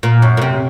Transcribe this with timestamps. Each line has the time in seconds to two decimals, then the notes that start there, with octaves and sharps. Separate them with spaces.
0.03 A#2
0.22 F#2
0.37 A#2
0.41 C3